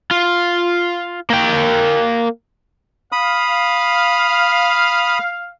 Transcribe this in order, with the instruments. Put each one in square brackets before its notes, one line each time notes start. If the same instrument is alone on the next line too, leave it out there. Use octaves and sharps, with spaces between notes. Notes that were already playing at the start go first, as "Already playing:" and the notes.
[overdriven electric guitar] F4
A#3 G5
[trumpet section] F5 [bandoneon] B5 D#6